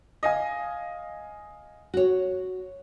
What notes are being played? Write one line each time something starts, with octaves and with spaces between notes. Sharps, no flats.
D#5 F5 G#5
F#4 C#5